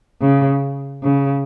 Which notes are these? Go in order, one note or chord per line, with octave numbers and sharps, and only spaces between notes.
C#3
C#3